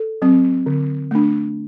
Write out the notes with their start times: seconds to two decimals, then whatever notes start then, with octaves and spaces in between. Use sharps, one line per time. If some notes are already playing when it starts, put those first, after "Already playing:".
Already playing: A4
0.22 F#3 C4
0.66 D3
1.11 A3 D4